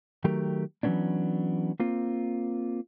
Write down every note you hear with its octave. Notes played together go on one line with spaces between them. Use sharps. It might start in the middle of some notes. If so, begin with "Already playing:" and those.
D#3 F#3 A3 G4 A#4
E3 F#3 G#3 B3 C#4 D4
A#3 C4 F4